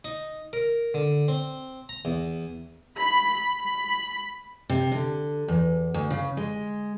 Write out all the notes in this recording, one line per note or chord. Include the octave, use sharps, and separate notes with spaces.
D#4
A#4
D3
C4
A#5
E2
B5
B5
C3
D3
E2
D2
C#3
G#3